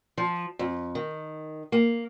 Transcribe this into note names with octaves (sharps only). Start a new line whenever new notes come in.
F3
F2
D#3
A#3